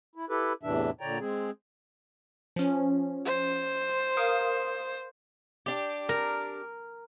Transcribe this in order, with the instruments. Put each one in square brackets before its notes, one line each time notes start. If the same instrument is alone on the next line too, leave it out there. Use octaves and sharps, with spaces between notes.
[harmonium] E4
E4 G4 A4 B4
E2 A2 C3 E3 D4 E5
A#2 D3 C#5 D5 G5 A#5
G#3 C4 G#4
[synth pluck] F3 C#4
[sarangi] C5
[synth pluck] A#4 F5 D#6
[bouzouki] D4 G4
[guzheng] A#4